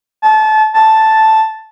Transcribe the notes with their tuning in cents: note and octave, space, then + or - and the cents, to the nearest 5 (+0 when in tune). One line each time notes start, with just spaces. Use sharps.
A5 -25
A5 +0